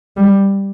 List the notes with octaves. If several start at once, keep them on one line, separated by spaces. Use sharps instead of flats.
G3